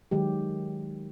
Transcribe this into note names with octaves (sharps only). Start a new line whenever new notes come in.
D#3 F#3 G#3 G4